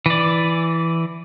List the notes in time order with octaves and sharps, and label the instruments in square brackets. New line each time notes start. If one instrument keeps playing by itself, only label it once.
[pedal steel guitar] E3 D5